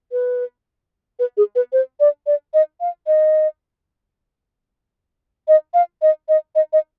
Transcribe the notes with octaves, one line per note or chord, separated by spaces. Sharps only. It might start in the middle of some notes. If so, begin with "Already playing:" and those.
B4
B4
G#4
B4
C5
D5
D5
D#5
F5
D#5
D#5
F5
D#5
D#5
D#5
D#5